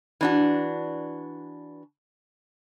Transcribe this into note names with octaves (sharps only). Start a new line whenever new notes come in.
E3 D4 F#4